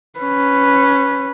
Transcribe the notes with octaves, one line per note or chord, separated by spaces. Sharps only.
C#4 B4